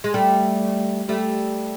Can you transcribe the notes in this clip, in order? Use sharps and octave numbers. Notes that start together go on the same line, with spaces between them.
G#3
G3 A3
G3 A3